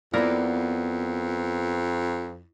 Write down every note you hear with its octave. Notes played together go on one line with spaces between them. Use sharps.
F2 A#3 B3 E4 A#4 D5